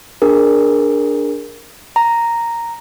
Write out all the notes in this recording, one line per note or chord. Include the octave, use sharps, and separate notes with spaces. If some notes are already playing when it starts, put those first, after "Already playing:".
D4 G#4 A#4
A#5